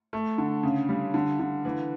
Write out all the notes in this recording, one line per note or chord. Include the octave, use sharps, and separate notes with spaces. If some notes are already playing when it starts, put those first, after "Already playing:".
A3
D3
C#3
G3
D3
D3
E3